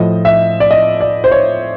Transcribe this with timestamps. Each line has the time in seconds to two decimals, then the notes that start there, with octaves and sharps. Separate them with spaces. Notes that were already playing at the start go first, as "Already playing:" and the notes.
Already playing: A2 F3 D#5
0.25 E5
0.60 D5
0.71 D#5
1.01 D5
1.24 C5
1.32 C#5